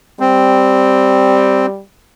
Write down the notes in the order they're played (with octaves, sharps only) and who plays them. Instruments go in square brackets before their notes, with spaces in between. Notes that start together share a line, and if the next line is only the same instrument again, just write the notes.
[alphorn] G3 [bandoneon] C4